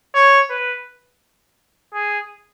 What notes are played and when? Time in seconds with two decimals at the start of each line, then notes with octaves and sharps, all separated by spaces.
0.14 C#5
0.50 B4
1.94 G#4